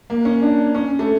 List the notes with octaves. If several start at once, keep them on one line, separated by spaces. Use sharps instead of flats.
A#3
C#4
D4
C#4
A3